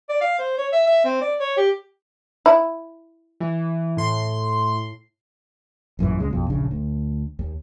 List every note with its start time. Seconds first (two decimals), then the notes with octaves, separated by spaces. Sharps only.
0.09 D5
0.21 F5
0.39 C5
0.58 C#5
0.73 E5
0.87 E5
1.05 C4
1.22 D5
1.40 C#5
1.57 G4
2.46 E4
3.40 E3
3.97 A2 C6
5.99 A1 F#2 A#2 E3
6.19 C#2 G#3 C#4
6.31 A#1 F2 B2
6.50 D#1 A#1 C#3 D4
6.71 D2
7.39 D#2